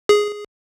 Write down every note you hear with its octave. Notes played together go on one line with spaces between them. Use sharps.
G#4